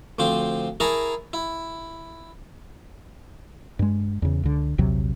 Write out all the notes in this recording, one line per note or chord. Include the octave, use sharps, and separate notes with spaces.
D2 F3 C4 D6
E4 G#4 A#4 A5 A#5 C#6
E4
G2 G#3
E2 C#3
C#2 D3
A#1 D#2 C3 F#3